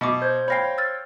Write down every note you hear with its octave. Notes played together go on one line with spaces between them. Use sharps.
B2 E5 C#6 D6
C5 G6 G#6
C#5 F5 G5 B5 A#6 C7
E6 F6 A6